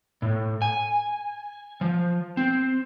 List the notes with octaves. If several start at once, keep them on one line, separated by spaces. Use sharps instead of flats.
A2
G#5
F3
C4